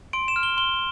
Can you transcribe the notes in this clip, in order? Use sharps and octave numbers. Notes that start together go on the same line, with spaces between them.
C6 D7
E7
F6
G7
C6 G7